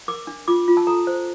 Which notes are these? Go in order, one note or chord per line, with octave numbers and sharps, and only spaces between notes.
A#4 D6
D4
F4 D6
F4
A5
A4 A#5
C5